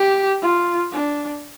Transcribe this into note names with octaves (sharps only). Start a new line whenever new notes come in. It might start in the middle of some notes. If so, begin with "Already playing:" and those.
Already playing: G4
F4
D4